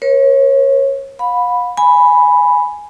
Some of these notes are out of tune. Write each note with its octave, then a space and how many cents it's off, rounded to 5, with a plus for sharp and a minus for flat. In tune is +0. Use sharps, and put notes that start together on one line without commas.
A#4 +40 C#5 -25
F5 +45 B5 +0
G#5 +0 B5 +0